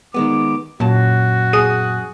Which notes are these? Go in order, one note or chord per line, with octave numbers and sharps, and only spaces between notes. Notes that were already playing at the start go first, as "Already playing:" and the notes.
D#3 G#3 B3 D6
F#2 A#2 F#4 A5
G#4 D#6 D#7